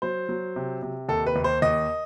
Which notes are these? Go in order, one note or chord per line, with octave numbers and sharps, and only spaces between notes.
F#3 C5
F#3
C3
C3
D#2 A4
B4
D#2
C5
D#2 D#5